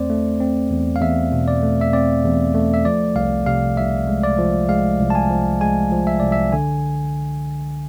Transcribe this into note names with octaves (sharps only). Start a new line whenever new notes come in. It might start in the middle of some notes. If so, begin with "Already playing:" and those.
Already playing: E2 A3 C4 C5 D5
A3
C4
E2
F5
E2 E5
B2
D5
A3
E5
C4 D5
E2
A3
E5
F3 D5
C2 F5
C3 F5
C2 E5
G#3
D5
F3
G#3 F5
C2
A5
G#5
F3
G#3 G#5
F3
E5
C2 D5
E5
D3 G#5